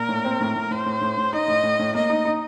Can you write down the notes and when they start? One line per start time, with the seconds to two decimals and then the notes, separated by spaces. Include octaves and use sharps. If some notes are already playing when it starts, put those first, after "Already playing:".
Already playing: A#2 A#4
0.09 A2
0.25 C4
0.40 A2
0.55 A2
0.71 A2 C5
0.86 A2
1.01 A2
1.17 A2
1.33 D#4 D#5
1.48 A2
1.63 A2
1.79 A2
1.95 A#3 D#5
2.10 D#4
2.25 D#4